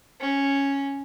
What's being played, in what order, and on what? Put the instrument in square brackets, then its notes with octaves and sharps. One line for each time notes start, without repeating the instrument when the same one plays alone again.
[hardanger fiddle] C#4